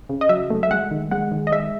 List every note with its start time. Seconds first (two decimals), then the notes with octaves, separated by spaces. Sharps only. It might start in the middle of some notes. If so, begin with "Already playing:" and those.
0.09 C#3
0.21 D#5
0.29 F#3 E5
0.50 A3
0.63 E5
0.71 G#3 F#5
0.91 D#3
1.11 G#3 F#5
1.32 D#3
1.47 D#5
1.52 G#3 E5